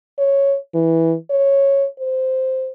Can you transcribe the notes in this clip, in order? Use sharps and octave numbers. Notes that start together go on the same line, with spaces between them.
C#5
E3
C#5
C5